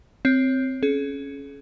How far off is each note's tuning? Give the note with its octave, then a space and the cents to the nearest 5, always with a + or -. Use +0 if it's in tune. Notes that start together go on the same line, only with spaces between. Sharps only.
C4 +0 C#5 +0
C#4 +0 G#4 +45